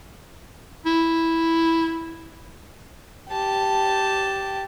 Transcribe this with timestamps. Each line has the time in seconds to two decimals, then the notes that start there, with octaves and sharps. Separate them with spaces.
0.86 E4
3.31 G4 A5